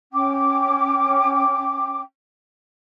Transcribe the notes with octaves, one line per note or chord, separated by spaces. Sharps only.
C#4 G5 D6